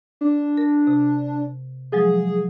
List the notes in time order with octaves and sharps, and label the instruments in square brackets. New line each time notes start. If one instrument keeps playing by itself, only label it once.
[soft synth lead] D4
[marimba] A#4
C3
[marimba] F3 F#3 G#3 [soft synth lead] G#4